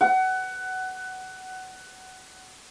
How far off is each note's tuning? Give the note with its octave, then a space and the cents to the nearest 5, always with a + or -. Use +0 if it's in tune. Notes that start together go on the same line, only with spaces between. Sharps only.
F#5 +20